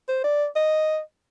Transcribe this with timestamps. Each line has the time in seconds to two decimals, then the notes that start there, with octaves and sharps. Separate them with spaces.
0.08 C5
0.24 D5
0.56 D#5